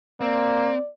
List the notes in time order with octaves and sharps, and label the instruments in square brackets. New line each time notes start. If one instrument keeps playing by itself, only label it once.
[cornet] A#3 [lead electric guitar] C4 [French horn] D5